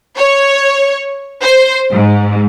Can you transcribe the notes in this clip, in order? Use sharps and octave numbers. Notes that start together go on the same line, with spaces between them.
C#5
C5
G#2